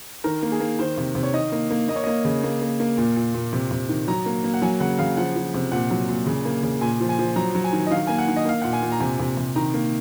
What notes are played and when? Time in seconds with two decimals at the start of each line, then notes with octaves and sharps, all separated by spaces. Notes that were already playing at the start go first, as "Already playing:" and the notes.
0.24 D#3 A#4
0.43 A#3
0.52 G#4
0.60 A#3
0.79 D#3 C5
0.97 C3
1.15 C3
1.23 C#5
1.33 D#3 D#5
1.52 A#3
1.71 A#3
1.88 A#3 D#5
1.96 C#5
2.04 A#3 D#5
2.25 C#3
2.43 A#3
2.62 A#3
2.80 A#3
2.98 A#2
3.16 A#2
3.34 A#2
3.53 C3
3.71 C3
3.89 D#3
4.08 F#3 A#5
4.26 A#3
4.44 A#3
4.54 F#5
4.62 F#3 G#5
4.80 C#3 F#5
4.99 C#3 F5
5.17 F3 F#5
5.36 F3
5.54 C3
5.72 A#2 F#5
5.91 F#3
6.08 A#2
6.26 C#3
6.45 A#3
6.63 C#3
6.81 A#2 G#5
7.00 F3
7.09 G#5
7.18 F3
7.36 F#3 A#5
7.55 F#3
7.64 G#5
7.73 D#3
7.87 D#5
7.91 D#3 F5
8.07 A#3 G#5
8.18 F#5
8.28 D#3
8.36 D#5
8.45 A#3 F5
8.62 A#2 F#5
8.73 G#5
8.83 A#2
8.92 A#5
9.00 C3 G#5
9.19 C3
9.37 C3
9.56 D#3 A#5
9.74 A#3